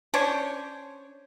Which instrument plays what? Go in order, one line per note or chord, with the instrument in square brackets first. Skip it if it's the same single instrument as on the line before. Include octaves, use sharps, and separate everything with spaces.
[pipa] C#4 D4 C5 C#5